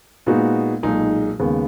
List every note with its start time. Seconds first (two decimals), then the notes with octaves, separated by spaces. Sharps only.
0.26 A#2 G#3 B3 D#4 F#4
0.83 B1 A#2 G#3 D#4 G#4
1.39 D#2 C#3 G#3 B3